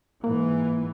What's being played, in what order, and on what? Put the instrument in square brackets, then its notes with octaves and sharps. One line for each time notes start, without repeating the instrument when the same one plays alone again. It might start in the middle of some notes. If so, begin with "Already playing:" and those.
[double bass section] G#2 E3 [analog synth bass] A#3